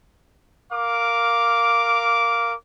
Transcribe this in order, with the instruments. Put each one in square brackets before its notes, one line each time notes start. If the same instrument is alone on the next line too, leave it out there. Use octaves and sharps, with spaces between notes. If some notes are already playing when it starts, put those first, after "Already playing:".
[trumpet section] A#4 F5 D6